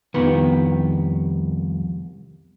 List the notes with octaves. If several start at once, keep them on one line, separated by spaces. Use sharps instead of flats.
C2 F2 D#3 B3